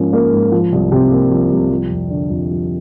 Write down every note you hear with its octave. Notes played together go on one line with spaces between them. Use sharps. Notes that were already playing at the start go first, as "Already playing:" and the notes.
Already playing: G#2 F3 A#3 C#4
A#3
G#2
F3
C2
C3
A#3
F3
C2
F3
F2
D3
F2
F3